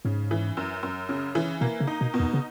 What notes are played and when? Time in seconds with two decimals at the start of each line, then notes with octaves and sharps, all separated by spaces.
0.05 G#2 C#3
0.31 E3
0.57 F#2
0.83 F#2
1.09 C#3
1.35 E3
1.61 B2 A#3
1.80 C#3
1.87 D#4
2.01 B2
2.14 B2
2.20 E2
2.34 C#3